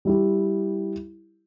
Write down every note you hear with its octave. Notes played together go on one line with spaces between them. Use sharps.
G3 E4 G4